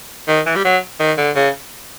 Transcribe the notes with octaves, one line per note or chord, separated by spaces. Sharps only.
D#3
E3
G3
F#3
D#3
D3
C#3